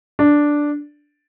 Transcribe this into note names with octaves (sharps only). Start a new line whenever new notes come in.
D4